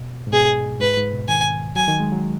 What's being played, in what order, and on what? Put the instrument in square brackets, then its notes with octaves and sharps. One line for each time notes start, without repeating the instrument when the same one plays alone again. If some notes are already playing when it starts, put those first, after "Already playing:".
Already playing: [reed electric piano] B2
G#2
[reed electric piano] B2 [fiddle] G#4
[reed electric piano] G#2 [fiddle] B4
[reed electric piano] G#2
B2
[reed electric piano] D#3 [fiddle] G#5
[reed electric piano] F#3 [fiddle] G#5
[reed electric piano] D#3
G#3
F#3